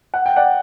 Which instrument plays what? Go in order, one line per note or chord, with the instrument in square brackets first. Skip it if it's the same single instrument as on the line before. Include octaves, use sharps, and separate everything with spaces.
[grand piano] F#5
G5
D5 F#5